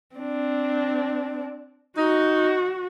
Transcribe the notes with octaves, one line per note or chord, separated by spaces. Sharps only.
C4 D4
D#4 F#4